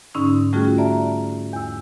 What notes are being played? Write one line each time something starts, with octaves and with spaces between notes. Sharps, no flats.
G#2 D3 C#4 D#4 E6
G3 A3 C#4 F4 F#4 G#4
D5 E5 A5 A#5
E2 E6